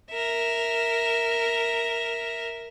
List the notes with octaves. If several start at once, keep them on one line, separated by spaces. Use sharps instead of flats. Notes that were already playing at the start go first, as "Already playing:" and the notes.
A#4 E5